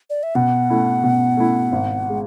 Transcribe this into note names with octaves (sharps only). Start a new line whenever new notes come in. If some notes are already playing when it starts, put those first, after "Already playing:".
D5
E5
B2 F#5
A3 E4
B2
A3 E4
G#1
G#3